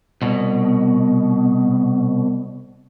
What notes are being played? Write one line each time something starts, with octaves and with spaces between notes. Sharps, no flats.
C2 B2